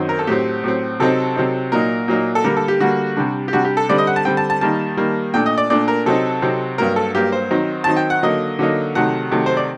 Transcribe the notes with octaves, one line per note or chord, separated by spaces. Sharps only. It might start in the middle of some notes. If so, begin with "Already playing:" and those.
Already playing: F#2 D#3 F#3 C4
A#4
A4
A2 F#3 C4 G4
A2 F#3 C4
C3 F#3 C4 D#4 A4
C3 F#3 C4 D#4
A#2 F#3 A#3 D#4 A#4
A#2 F#3 A#3 D#4
A4
D3 G3 A#3 A#4
A4
G4
D3 G3 A#3 F#4
C3 G3 D4
G4
C3 G3 D4 F#4
G4
A4
D3 G3 C4 D5
D#5
F#5
A5
D3 G3 C4 G5
A5
A5
D#3 G3 A#3 A5
D#3 G3 A#3
A#2 A3 D4 G5
D#5
D5
A#2 A3 D4 D5
A#4
C3 F#3 C4 D#4 A4
C3 F#3 C4 D#4
G2 F#3 A#3 A#4
A4
G2 F#3 A#3 G4
C5
D#3 F#3 C4 D#4
D#3 F#3 C4 D#4 A5
G5
F#5
D3 F#3 A#3 D#4 D#5
D3 F#3 A#3 D#4
C3 D#3 F#3 A3 F#5
C3 D#3 F#3 A3
C5
D5